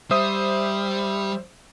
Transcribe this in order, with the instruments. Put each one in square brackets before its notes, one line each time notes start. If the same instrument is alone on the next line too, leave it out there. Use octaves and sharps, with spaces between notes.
[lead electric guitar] G3 [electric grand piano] C5 E5 D#6